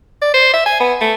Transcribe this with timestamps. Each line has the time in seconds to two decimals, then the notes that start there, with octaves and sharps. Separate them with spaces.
0.22 D5
0.34 C5
0.54 E5
0.66 G#5
0.80 B3
1.01 A3